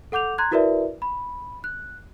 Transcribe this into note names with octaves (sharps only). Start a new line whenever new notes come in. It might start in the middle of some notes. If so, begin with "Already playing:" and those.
A4 F#5 D6 G6 F7
A#5 C6 F#6 G#6
E4 F#4 A#4 B4 D5 E5
B5
F#6